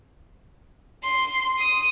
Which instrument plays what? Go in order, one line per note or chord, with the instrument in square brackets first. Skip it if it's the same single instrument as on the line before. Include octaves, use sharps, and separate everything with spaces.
[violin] C6
D#6